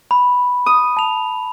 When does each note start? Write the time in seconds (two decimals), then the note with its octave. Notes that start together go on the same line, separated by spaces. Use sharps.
0.11 B5
0.66 D#6
0.97 A5 F7